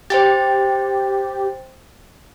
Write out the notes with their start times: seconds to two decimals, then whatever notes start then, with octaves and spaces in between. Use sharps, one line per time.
0.10 G4 C5 G5 A6